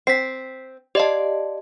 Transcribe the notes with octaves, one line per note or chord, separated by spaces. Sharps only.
C4 B6 C7
G4 D5 D#5 F5 A5